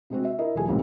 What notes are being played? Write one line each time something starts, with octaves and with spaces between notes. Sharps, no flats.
C3 G#3 C4 F#4
E5
E4 A#4 D#5
D#1 F3 G3 A3 G#4 G#5
B1 G#2 D#3 C4 C#4 G4